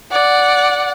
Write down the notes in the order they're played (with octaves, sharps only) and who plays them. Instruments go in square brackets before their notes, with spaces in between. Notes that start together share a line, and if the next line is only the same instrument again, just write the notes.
[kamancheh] D5 F#5